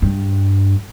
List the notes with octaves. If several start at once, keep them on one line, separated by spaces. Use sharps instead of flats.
G2